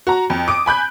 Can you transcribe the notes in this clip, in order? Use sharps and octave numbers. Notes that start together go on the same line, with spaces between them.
F#4 A#5
F2
D6 D#6 D7
G#5 B5 F#6 G6